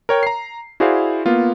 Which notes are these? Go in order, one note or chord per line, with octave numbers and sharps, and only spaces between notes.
A#4 C#5 G5
A#5 C7
E4 F#4 G#4 C5 D5 F5
A#3 B3 F4